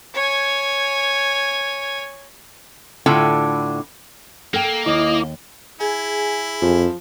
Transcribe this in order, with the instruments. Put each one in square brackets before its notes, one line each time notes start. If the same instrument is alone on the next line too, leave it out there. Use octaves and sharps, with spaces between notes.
[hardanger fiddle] C#5 G#5
[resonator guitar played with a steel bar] A2 D3 E4 F4 G5
[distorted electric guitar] A#3 [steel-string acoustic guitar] A4 G5
[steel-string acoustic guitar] D#2 [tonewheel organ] E4 D6 [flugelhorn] D#5
[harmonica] E4 [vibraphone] G#4 G#5
[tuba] F2 [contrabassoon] F3